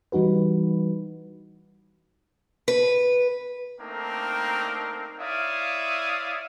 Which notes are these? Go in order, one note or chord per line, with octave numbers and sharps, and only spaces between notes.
E3 G3 D#4 F#4 B4
B4
A3 A#3 C4 D4 D#4 A#4
E4 C#5 D5 E5 F5 D#6